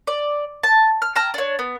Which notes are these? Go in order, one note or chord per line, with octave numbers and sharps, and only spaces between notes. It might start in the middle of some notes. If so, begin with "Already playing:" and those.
D5
A5
F6
G5 A5 A#5 F6
D4 C#5
B3